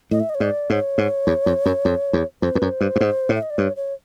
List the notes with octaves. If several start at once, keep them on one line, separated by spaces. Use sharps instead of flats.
A2 D#5
E5
D#5
C#5
G#2 D5
G#2 C#5
G#2
E2
F2
F#2
F2
E2
F2 C5
F2 B4
F#2
C5
G2
G2
G#2
A2
E5
D#5
D5
G2 C#5
C#5